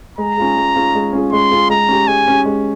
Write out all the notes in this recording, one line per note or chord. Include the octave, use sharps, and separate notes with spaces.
G#3 A#5
C#4 F4 G#4
G#3
C#4 F4 G#4
G#3
C#4 F4 G#4
G#3 C6
C#4 F4 G#4
G#3 A#5
C#4 G4
G#3 G#5
C#4 G4
G#3